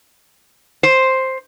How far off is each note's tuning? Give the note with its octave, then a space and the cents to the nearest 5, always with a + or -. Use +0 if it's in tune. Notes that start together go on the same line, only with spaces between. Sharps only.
C5 +5